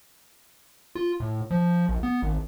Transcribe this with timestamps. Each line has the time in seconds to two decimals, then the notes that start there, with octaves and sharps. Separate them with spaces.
0.95 F4
1.20 A2
1.51 F3
1.89 A#1
2.03 B3
2.22 G#1